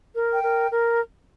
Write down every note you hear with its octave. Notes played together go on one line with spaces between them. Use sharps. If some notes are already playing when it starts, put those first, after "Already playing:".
A#4
G5
A#4
A#4